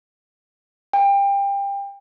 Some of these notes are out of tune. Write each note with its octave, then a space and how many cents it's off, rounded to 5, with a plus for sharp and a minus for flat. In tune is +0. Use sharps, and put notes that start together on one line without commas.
G5 +25